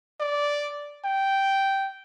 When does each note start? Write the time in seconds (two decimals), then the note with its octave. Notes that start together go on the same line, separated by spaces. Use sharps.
0.20 D5
1.05 G5